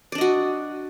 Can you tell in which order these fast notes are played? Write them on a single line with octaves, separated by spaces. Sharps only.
D5 D4 D#5 F#4